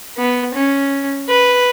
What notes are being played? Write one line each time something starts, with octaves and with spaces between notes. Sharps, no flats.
B3
C#4
B4